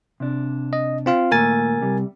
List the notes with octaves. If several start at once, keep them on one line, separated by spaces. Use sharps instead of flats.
C3 D4
D#5
C4 F4 F5
D#2 A#2 A3 A#4 G#5 A6
C3 G3